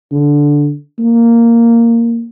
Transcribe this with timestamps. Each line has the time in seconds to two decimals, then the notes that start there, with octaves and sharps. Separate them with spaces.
0.12 D3
0.99 A#3